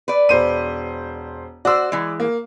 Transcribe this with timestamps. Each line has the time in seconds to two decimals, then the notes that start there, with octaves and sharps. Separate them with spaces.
0.08 B4 D5
0.29 E1 C5 D#7
1.65 F#4 C5 D5 E6
1.92 E3 G#3
2.20 A#3